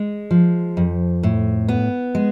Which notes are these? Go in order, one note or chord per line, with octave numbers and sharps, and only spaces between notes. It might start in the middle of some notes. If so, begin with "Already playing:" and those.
Already playing: G#3
F3
F2
A2
B3
G#3